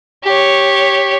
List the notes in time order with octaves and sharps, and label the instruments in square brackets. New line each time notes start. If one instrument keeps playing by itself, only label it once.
[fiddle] G4 C#5